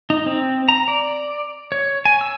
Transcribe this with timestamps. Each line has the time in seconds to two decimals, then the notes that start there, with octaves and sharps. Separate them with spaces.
0.10 D#4
0.26 C4
0.69 A#5
0.88 D5
1.72 C#5
2.05 G#5
2.21 E6